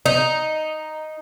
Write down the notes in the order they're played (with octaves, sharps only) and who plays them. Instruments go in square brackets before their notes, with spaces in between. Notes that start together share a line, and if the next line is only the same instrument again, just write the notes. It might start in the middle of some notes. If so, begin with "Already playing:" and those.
[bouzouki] D#4